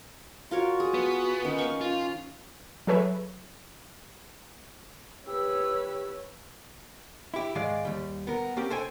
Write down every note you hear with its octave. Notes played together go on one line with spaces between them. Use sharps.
F4 F#4 A#4 C#5
G#4
B3
D#3 C#4
F5 C#6
F4
F#3 G#4 A4 B4 C#5 E5
G4 B4 C#5 E6
E4 G4
G#2 D#3 G#3 G#4 D5 F5
D#2 G3
B3 A#4
A#3 C4 C#4 G4
A4 C5 G5 G#5